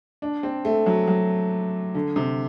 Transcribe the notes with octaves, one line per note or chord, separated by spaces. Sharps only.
D4
C4
A3
F#3
F#3
D3
C3